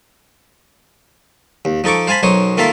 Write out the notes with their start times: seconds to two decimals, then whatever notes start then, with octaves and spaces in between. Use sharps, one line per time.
1.65 D#2
1.84 F3 D#4 A4 C#6 D6
2.07 C5 F5 G#5 A5 B5
2.23 B1 F#2 D#4 C5 C#5 D#6
2.57 D#3 A#3 F4 A4 E5 F5